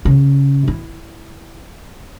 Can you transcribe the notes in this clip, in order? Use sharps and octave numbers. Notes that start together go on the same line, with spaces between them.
C#3
E4